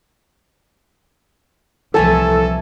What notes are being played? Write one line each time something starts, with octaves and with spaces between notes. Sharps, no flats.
C2 A#2 E3 F3 A3 A4 G#5 A5